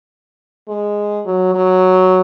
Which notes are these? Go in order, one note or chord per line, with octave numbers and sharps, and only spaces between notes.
G#3
F#3
F#3